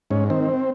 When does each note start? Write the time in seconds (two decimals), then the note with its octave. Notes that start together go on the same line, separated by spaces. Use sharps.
0.11 G#2 C#4
0.30 D#3 C4